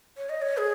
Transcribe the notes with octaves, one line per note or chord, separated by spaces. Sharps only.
C#5
D#5
C#5
G#4